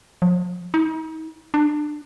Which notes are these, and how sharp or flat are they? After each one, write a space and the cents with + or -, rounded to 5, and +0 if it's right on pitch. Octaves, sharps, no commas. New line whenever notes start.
F3 +45
D#4 +40
D4 +25